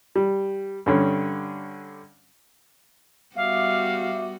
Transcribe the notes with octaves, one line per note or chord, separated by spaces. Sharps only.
G3
G2 D3 C#4
G3 B3 F#4 E5 F5 D6 D#6